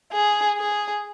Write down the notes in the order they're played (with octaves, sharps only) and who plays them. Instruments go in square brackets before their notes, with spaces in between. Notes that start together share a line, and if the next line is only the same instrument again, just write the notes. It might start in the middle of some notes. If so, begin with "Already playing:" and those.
[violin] G#4
G#4